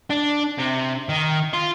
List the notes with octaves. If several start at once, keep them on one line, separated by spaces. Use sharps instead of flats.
D4
C3
D#3
F4